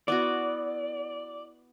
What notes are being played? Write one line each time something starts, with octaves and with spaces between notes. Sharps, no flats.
B3 E4 F#4 D5